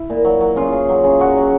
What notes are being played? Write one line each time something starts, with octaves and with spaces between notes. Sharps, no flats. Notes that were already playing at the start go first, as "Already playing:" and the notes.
Already playing: E4
A#2
F#3
F#3
C#3 F4
C#3
F#3
C#3
F#3 F#4
F#3